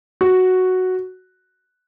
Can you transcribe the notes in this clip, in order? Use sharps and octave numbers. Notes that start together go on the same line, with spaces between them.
F#4